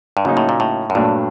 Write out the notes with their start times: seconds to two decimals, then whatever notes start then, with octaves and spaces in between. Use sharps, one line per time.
0.17 G2
0.25 G#2 C#3 F#3 A#3 D#4
0.37 A2
0.49 A#2
0.60 A2
0.90 F#2
0.95 G2 A#2 F#3 A3 D4